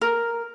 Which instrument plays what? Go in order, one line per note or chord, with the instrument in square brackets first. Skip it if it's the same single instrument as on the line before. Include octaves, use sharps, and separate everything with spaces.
[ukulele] A#4